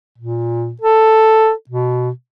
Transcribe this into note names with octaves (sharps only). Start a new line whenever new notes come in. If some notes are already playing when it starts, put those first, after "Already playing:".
A#2
A4
B2